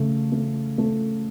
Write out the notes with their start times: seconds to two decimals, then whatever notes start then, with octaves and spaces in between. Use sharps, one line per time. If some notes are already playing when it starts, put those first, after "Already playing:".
Already playing: C#3 A3
0.32 A3
0.78 A3